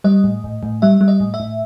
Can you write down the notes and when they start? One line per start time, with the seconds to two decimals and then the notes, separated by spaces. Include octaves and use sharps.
0.04 G3 D#5
0.24 A2
0.44 A2
0.63 A2
0.82 G3 E5
1.01 G3
1.08 D#5
1.20 A2
1.34 E5
1.40 A2